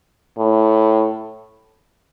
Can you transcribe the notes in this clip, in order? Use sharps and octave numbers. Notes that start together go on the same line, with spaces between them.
A2